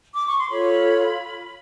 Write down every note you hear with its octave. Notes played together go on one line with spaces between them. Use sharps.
D6
C#6
C6
F4 A4 C#5 B5